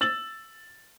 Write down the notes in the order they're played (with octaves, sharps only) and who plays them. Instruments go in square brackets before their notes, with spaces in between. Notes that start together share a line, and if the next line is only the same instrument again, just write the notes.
[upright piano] E6 A6 F#7